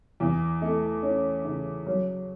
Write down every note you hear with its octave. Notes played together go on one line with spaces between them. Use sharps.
E2
A3
C#4
C#3
F#3